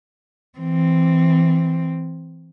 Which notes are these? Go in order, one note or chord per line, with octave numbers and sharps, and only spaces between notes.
E3 C4